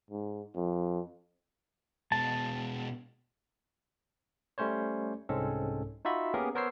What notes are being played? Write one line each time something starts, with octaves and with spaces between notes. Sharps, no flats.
G#2
F2
B2 G#3 A5
G3 A3 C#4 C5 C#5
C2 G#2 G#3 C4 C#4 A4
D#4 F4 F#4 E5 B5
A#3 B3 C#4 G4 G#4 A#4
B3 A#4 C5 C#5 E6 C7